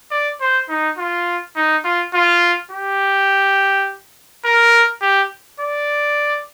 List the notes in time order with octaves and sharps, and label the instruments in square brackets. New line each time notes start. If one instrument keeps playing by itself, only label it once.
[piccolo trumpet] D5
C5
D#4
F4
D#4
F4
F4
G4
A#4
G4
D5